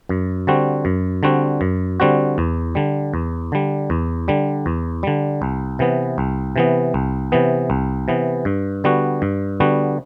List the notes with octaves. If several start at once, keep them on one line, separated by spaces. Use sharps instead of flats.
F#2
D3 G3 C4 F#4
F#2
D3 G3 C4 F#4
F#2
D3 G3 C4 F#4
E2
D3 G3
E2
D3 G3
E2
D3 G3
E2
D3 G3
C2
C3 E3 B3
C2
C3 E3 B3
C2
C3 E3 B3
C2
C3 E3 B3
G2
D3 G3 B3 F#4
G2
D3 G3 B3 F#4